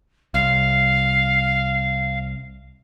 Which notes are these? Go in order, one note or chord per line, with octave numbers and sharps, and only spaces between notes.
C2 F5